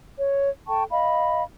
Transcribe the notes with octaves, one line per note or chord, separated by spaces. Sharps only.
C#5
A4 G5 A5 C#6
D#5 F5 B5